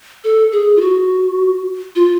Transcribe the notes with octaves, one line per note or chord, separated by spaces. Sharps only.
A4
G#4
F4
F#4
F4